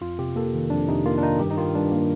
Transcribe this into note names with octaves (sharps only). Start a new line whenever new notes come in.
F2 F4
C3 G4
A#3 A4
D#3
F2 D4
C3 D#4
A#3 F4
D4
D#3 D#4
G2 G4
D#4
D#3 F4
G2 D4
A#3